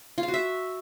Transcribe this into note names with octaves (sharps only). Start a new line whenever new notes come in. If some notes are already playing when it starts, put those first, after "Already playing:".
F4
F5
F#4
E5